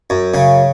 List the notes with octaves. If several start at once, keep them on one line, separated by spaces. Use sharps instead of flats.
F#2
C#3